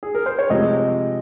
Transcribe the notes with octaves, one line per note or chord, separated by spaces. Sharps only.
G#4
A#4
C5
C#5
C3 F3 G#3 C4 D#5